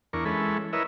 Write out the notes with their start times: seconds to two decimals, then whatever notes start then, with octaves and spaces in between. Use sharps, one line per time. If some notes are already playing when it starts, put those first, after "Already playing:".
0.13 E2 D4 A#4 C#6
0.25 E3 G#3 C#4 A4 B5
0.73 E4 A#4 B4 C#5 D#5 E5